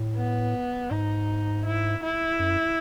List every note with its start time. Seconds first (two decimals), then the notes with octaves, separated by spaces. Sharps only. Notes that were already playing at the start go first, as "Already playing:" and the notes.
Already playing: A2
0.16 B3
0.91 G#2 D#4
1.65 E4
2.03 E4
2.39 F#2